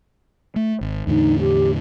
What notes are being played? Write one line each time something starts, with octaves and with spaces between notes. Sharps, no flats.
A3
G#1
E2 A2 D3 D#4
G4